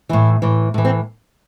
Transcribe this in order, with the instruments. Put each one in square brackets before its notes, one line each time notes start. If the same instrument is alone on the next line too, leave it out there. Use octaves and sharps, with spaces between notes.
[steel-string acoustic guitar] A2 E3 E4
A2 E3
A2 E3
C4